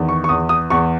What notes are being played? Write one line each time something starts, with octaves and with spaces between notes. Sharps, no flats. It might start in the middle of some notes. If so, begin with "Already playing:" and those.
Already playing: E2 D#3
C#6
C#6
E2 D#6
D#6
E2 C#6